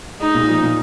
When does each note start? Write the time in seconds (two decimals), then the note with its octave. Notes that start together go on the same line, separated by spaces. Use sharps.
0.20 G#3 D#4
0.34 A#2
0.49 F3
0.62 A#2